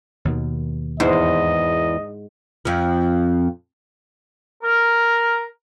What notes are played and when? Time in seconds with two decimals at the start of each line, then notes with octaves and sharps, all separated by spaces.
0.25 D#2 B2 D#3
1.00 E2 G#2 C5 D#5
2.65 F2 F3
4.63 A#4